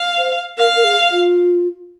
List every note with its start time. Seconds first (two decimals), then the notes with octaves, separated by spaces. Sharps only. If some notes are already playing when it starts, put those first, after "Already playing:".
Already playing: F5
0.18 C5
0.58 A#4 F5
0.76 A#4
0.84 G#4
1.11 F4